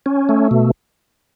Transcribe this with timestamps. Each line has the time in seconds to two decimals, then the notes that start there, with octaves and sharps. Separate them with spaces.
0.06 C#4
0.29 A3
0.51 B2